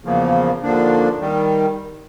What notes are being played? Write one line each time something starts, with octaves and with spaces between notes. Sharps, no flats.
E2 C#3 F3 A#3
D#2 D3 F3 A#3 D4
D#3 G3